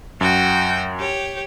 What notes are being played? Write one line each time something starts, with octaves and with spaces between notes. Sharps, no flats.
F#2 F#4 G5
G4 C#5